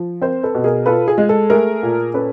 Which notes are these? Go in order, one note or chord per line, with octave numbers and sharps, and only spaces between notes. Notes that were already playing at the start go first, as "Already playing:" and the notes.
Already playing: F3
C4 A#4 C5
A4 B4
B2
G#4 A#4
F4 A4 B4
G#4
G#3
A4
A3 G#4 A#4
A#2
C#4 A4 B4